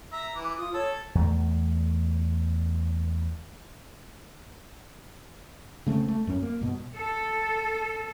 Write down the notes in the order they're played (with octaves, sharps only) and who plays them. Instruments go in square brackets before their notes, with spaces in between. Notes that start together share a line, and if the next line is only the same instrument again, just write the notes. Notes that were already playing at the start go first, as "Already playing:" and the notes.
[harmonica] E5 A#5
E3 D6
[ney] F4 [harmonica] D#6
[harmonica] A4 [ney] C#5
[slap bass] E2 A3
[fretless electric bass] C#3 A3 B3 C4
A3
F#2 C#4
A#3
G2 B2
[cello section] A4